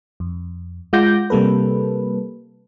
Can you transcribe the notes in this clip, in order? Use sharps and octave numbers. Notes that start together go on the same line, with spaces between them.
F2
G#3 F4 F#5 D6 G6 A#6
C3 G3 A#3 A4 B4